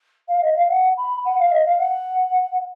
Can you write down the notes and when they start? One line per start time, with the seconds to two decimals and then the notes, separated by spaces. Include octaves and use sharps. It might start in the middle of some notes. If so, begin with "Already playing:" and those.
0.29 F5
0.42 D#5
0.56 F5
0.70 F#5
0.97 B5
1.25 F#5
1.39 F5
1.51 D#5
1.66 F5
1.79 F#5